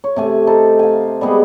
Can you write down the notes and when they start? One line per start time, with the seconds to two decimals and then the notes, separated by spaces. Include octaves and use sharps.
0.04 C#5
0.16 C3 A3 G#5
0.47 D#4 A4 C5
0.79 F5 G#5
1.21 G3 G#3 B3 G#4